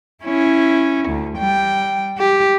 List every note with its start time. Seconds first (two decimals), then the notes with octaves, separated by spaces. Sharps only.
0.24 C#4 E4
1.09 D2
1.38 G3 G5
2.18 G4